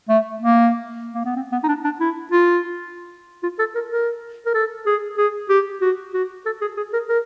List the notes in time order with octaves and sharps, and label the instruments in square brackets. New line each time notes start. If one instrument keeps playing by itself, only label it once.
[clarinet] A3
A#3
A#3
B3
C4
B3
D#4
D4
D4
E4
F4
F4
A4
A#4
A#4
A#4
A4
G#4
G#4
G4
F#4
F#4
A4
G#4
G#4
A#4
A#4